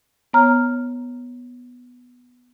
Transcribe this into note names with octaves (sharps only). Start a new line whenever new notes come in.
B3 C#5 A#5 F6